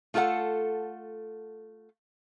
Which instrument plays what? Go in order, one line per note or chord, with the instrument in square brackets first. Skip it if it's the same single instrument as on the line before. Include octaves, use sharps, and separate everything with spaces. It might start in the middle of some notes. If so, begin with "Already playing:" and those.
[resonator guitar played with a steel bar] A3 F4 A4 A#4 F#5